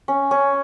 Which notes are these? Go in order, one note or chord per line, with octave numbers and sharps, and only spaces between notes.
C#4
C#4